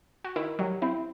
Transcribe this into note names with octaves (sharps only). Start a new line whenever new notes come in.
F#4
D#3 E4
F#3 G3
C4 E4